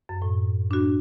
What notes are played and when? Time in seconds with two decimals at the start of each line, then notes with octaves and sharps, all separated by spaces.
0.09 F#2
0.22 A2
0.71 D4 F#4